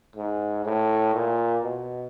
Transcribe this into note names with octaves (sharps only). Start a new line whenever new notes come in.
G#2
A2
A#2
B2